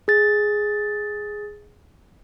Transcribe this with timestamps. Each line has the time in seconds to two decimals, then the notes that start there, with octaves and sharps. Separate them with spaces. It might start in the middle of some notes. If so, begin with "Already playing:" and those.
0.08 G#4 A6